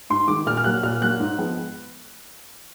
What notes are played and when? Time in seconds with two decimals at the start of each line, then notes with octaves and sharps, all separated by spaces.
0.10 G#2 C6
0.28 D#3 G#3 D6
0.46 A#2 F6
0.57 F6
0.64 F#3 A#3 F#6
0.83 A#2 F6
1.01 F#3 A#3 F#6
1.20 G#2
1.38 F3 G#3 B3